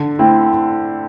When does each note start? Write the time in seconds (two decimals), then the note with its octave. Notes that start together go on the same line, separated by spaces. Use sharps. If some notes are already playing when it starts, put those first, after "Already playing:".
Already playing: D3
0.19 A3 C4 E4